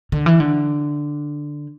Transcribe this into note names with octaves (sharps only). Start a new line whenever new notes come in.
D3
E3
D3